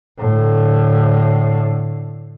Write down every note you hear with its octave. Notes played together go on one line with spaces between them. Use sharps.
A2 D3